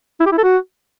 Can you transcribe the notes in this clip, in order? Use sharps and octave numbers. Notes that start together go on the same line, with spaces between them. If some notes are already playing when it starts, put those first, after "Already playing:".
E4
G4
E4
A4
F#4